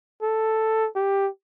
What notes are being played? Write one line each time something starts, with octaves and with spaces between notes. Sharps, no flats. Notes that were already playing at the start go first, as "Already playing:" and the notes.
A4
G4